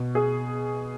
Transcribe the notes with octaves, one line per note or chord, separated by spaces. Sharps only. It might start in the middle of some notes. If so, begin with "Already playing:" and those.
Already playing: B2
G#4